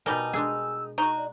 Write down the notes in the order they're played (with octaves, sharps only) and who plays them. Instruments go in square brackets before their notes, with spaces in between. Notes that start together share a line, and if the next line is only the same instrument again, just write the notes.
[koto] B2 A#4 [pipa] G3 D#4 [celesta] G#5 [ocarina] A5
[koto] G#3 D4 G#4 [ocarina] E6
[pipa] D#4 F#4 [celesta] A#5 [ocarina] C#6
[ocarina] D5